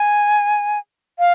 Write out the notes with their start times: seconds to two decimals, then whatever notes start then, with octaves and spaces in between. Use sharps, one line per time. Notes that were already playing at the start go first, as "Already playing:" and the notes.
Already playing: G#5
1.19 F5